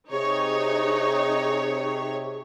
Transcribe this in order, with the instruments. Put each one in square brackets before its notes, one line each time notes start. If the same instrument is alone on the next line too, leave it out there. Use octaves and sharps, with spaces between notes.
[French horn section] C3 [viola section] D#4 [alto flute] G#4 [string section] C#5